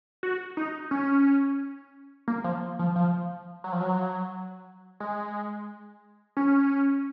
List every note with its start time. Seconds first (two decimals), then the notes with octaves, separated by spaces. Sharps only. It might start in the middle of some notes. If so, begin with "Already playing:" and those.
0.23 F#4
0.57 D#4
0.91 C#4
2.28 A#3
2.44 F3
2.79 F3
2.96 F3
3.64 F#3
3.72 F3
3.80 F#3
5.00 G#3
6.37 C#4